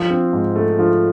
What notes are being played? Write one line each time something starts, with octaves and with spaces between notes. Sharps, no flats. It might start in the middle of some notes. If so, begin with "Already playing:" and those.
Already playing: F3
C4
G#2
A3
F3